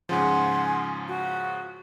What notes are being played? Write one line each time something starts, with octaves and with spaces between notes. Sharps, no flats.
G#2 C#3 F3 F#5 G#5 C6
F#4